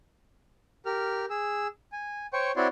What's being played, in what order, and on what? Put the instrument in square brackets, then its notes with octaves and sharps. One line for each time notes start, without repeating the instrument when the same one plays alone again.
[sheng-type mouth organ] G4 A#4 F6
G#4 E6
G#5
C5 C#5 G5 C#6
C4 E4 F#4 C#5 D5 C6